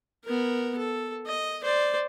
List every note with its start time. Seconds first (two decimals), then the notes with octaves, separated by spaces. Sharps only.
0.25 B3 A#4
0.78 A4
1.27 D#5
1.63 C5 D5